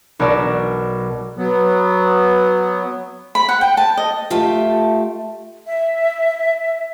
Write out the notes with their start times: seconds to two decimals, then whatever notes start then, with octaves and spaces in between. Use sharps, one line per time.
0.19 B1 F#4 A#4 D5 E6
1.37 F#3 B3
3.35 B5
3.49 F#5
3.61 G5
3.77 A5
3.97 D#5
4.30 A3 F4 G4 A4 E5
5.67 E5